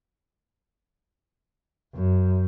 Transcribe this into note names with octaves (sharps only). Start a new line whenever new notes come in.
F#2